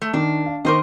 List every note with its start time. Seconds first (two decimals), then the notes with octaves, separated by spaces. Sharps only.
0.02 A3
0.13 D#3 D4
0.46 F5
0.65 D#3 A#4 C5 D#5 C#6 D6